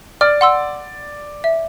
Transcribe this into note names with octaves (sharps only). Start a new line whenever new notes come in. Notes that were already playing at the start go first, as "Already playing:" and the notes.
D5 F6
F#5 C6 E6
E5